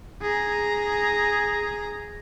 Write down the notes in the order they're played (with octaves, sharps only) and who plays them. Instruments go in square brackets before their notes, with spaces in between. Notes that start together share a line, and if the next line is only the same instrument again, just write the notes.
[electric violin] G#4 A#5